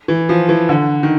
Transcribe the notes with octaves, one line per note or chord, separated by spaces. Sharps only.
E3
F3
E3
D3
D#3